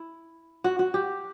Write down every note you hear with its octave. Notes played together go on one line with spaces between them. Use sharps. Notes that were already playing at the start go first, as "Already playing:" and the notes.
Already playing: E4
F#4
F#4
G4